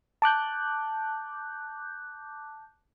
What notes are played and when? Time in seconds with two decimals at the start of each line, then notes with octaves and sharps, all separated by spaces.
0.22 A5 D6 F#6 G6